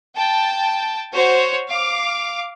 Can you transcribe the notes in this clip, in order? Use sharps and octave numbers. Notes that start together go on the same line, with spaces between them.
G5 A5
F#4 C5 C#5
F5 D6